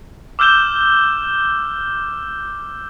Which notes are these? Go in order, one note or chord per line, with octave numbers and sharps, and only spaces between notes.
D6 E6 F6 G6 E7 G7